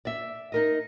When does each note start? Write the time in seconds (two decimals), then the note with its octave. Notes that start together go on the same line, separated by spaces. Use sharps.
0.05 D5 E5
0.52 D#4 A#4 D#5